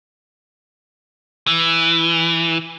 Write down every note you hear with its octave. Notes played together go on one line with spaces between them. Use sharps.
E3